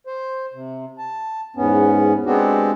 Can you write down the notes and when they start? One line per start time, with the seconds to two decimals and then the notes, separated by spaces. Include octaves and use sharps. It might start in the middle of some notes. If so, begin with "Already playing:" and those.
0.07 C5
0.54 C3
0.98 A5
1.56 E2 G#2 B3 C#4
2.26 G#3 B3 C4 D4 F#4 G4